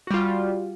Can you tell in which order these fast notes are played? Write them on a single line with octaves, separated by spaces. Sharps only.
F#4 G3 F4